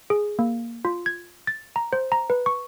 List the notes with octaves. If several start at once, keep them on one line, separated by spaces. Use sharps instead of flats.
G#4
A#3
F4
G#6
A6
A#5
C5
A#5
B4
C#6